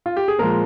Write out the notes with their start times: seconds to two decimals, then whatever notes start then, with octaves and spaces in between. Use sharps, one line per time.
0.06 F4
0.17 G4
0.28 G#4
0.38 A#2 F3 G#3 A#4